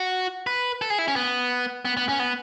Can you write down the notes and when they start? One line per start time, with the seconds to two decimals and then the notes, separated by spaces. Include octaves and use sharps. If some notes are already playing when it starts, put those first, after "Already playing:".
Already playing: F#4
0.47 B4
0.82 A4
0.90 G#4
0.98 E4
1.08 C#4
1.16 B3
1.85 B3
1.97 B3
2.09 C#4
2.20 B3